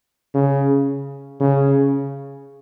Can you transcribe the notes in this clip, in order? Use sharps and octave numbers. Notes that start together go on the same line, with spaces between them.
C#3
C#3